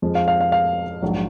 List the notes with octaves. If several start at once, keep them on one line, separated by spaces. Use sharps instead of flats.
F2 F3 G#3
F5
F5
F5
F5
A#1 G#2 F#3